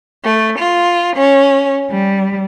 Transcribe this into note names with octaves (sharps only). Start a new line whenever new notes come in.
A3
F4
C#4
G3